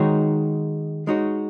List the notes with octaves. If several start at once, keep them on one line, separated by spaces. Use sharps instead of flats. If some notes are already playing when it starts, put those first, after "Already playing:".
Already playing: D#3 G#3 D#4 F#4 C#5
G#3 D#4 F#4 C#5